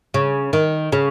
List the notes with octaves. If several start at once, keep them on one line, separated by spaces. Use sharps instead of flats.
C#3
D#3
C#3